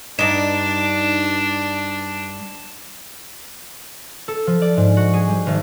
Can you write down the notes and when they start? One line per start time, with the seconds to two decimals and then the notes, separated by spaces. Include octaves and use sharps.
0.19 G2 D4 D#4 E7
4.28 A4
4.47 F3
4.62 D5
4.77 G#2
4.97 F#4
5.13 G#4
5.29 G3
5.47 G#1